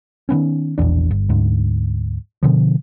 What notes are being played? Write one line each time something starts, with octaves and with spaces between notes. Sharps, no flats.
D#3 F3 B3 C#4
E1 A#1 E2 D4
G1
D2 G#2
B2 D3 F3